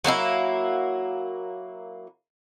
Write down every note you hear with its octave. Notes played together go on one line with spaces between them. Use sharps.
F#3 A#3 D#4 E4